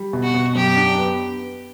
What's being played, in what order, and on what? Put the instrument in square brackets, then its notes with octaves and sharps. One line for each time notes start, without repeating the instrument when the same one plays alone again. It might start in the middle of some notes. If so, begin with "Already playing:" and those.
Already playing: [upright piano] G3
B2
[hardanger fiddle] F#4
[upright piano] B2
[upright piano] F#2 [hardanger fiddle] G4
[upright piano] D4
B3